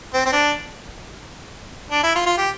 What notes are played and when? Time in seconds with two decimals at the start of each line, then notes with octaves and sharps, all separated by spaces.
0.14 C4
0.26 C4
0.33 D4
1.91 D4
2.03 E4
2.15 F4
2.26 F4
2.38 G4